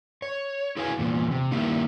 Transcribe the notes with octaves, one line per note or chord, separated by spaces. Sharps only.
C#5
E4 F#4 G#4 B4 F5 G#5
E2 A#2
C3
D#3 G3 A#3 D#4 E4